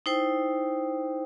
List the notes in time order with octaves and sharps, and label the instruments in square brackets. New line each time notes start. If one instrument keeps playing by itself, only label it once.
[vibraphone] D#4 E4 C5 G5